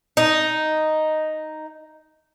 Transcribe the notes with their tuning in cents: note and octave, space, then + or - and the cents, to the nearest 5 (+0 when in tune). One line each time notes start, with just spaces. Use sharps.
D#4 +0